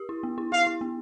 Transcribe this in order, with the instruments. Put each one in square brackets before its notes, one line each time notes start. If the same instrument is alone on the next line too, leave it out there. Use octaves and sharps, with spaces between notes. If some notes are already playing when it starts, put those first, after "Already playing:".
Already playing: [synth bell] G4
E4
B3
E4
[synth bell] E4 [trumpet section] F5
[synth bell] E4
B3